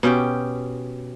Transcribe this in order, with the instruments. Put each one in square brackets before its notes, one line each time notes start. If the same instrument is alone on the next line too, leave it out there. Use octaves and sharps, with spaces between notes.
[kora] B2 C#4 G4 G5